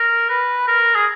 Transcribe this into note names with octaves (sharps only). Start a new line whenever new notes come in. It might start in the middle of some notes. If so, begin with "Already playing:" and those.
Already playing: A#4
B4
A#4
G#4